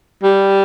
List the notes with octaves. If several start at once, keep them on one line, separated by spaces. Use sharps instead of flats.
G3